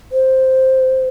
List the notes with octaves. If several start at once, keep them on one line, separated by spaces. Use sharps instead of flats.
C5